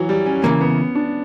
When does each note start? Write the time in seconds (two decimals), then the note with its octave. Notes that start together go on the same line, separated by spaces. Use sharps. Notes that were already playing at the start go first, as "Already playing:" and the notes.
Already playing: E3 F#3
0.09 G3
0.26 C#4
0.44 C#3 E3 A#3 C#4
0.61 B3
0.95 D4